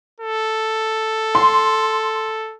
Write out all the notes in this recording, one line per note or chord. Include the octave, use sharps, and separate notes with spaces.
A4
C6